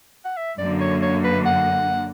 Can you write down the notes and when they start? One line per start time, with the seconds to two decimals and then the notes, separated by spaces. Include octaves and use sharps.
0.25 F#5
0.37 E5
0.59 F#2 D3 A#3 D5
0.81 C#5
1.02 C#5
1.24 B4
1.46 F#5